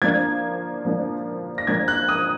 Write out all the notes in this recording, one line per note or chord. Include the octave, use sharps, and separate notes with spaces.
F3 A#3 D4 G#6
F3 A#3 D4
A#6
F3 A#3 D4 G#6
F#6
D#6